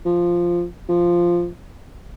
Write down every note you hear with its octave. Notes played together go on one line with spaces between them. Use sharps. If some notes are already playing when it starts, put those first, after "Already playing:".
F3
F3